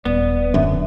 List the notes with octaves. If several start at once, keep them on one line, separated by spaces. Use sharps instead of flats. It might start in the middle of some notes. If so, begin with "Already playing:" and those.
D#1 B3 D5
F#2 D3 E5